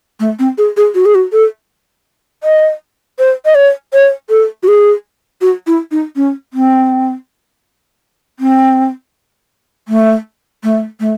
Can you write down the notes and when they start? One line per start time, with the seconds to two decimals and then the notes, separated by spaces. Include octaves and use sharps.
0.20 A3
0.39 C4
0.58 G#4
0.77 G#4
0.94 F#4
1.05 G#4
1.15 F#4
1.32 A4
2.43 D#5
3.19 C5
3.45 D#5
3.55 C#5
3.93 C#5
4.29 A4
4.63 F#4
4.68 G#4
5.41 F#4
5.67 E4
5.91 D#4
6.16 C#4
6.53 C4
8.39 C4
9.88 A3
10.63 A3
11.00 A3